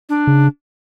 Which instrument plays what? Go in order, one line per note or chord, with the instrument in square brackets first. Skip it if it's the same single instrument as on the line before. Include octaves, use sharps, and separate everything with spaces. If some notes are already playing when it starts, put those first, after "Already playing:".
[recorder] D4
[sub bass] C#3